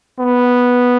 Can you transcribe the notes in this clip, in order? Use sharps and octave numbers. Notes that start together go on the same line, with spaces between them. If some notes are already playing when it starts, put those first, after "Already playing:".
B3